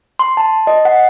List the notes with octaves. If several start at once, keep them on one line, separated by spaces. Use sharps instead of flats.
C6
A5
D#5
F#5